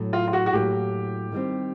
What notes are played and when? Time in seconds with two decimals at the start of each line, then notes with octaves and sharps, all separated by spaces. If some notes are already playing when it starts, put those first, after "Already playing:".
Already playing: A2 F#3
0.13 F4
0.28 F4
0.33 F#4
0.46 F#4
0.52 A2 F#3 A#3 G4
1.32 D#3 G3 C4